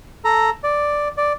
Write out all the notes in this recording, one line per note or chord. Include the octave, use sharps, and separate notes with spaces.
A4 A#5
D5
D5